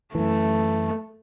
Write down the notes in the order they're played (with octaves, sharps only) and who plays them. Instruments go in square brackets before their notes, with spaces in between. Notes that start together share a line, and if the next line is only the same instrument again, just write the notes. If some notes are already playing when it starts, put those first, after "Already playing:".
[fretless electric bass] F#2 E3 [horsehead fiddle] A3